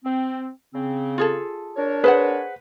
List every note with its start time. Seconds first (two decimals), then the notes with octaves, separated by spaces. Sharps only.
0.03 C4
0.74 C#3 C4
1.18 F4 G#4 A4
1.77 D4 A#4 C#5
2.04 G#4 B4 C5 F#5